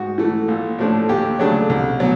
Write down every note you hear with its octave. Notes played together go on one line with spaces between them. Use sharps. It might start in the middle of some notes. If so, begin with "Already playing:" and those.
Already playing: G#2 F#4
E3 A3
A#1
A2 F3 A3 D4
D#2 G4
C#3 F#3 A3 D4
C2
B2 F#3